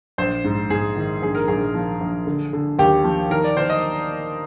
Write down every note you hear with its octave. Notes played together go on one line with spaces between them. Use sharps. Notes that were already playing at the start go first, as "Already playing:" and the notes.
A#1 C5
G#2
G#2 G#4
D#3
A#1 G#4
A#4
A#1 G#4
F3
A#1
D3
D3
D#2 G4
F3
D#3 A#4
D5
D#3 C5
D#5